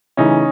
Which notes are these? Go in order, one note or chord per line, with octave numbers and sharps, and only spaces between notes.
C#3 E3 A3 C#4 D#4